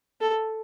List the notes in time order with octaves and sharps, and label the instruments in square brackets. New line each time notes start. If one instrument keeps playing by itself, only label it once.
[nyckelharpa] A4